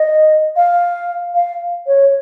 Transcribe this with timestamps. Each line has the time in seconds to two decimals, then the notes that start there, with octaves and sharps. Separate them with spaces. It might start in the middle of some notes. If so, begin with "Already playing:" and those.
Already playing: D#5
0.56 F5
1.34 F5
1.87 C#5